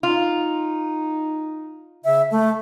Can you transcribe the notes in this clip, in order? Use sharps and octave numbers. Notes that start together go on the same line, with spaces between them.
D#4 F4
C#3 E5
A3 A4